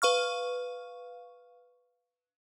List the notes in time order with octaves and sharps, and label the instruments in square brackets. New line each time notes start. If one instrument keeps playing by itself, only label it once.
[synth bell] B4 F5 C#6 F6